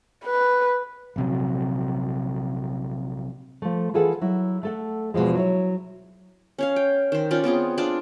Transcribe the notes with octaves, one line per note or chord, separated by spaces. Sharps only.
B4
A#1 C3 F#3
F3 A3
E3 F4 G#4 A4 B4 F#5
F#3 E4
A3 A4 F#5
E2 B2 E3 F3 G#3
F#3 E4 C#5
C#4 C#5 F5
G5
D#3 C5
C#4 F4 D5
B3 C4 F4 G#4
D4 F4 G#4 D5